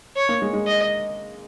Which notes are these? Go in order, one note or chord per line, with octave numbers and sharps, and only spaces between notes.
C#5
A#3
G#3
G#3
D#5